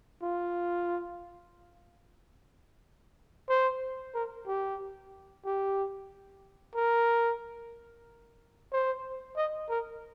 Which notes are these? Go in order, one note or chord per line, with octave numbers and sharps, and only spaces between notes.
F4
C5
A#4
G4
G4
A#4
C5
D#5
A#4